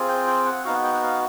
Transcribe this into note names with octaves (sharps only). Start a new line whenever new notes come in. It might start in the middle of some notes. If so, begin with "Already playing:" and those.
Already playing: C4 F4 G#4
G5
G5
F#5
B3 D#4 F#4 F5
F#5
G5
F#5
F5